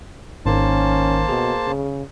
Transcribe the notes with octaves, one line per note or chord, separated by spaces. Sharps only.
G#1 D#3 A#3 C#4 C5 A5
B2 G#4
C#3